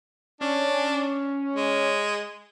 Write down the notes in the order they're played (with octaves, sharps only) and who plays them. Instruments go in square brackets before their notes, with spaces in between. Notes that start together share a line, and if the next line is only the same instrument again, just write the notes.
[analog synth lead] C#4 [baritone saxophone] D4
[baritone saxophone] G#3